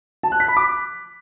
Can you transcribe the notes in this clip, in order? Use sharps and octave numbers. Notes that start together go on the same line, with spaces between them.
A5
F#6
B6
B5
D6